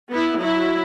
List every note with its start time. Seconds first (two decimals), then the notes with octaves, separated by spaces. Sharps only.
0.11 B3 E4
0.40 F#3 E4